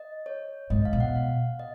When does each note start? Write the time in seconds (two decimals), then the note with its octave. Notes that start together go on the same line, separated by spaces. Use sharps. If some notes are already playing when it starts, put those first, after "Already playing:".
Already playing: D#5
0.26 C#5
0.70 G#2 D#5
0.85 F5
0.93 B2
1.00 F#5
1.15 F5
1.59 D#5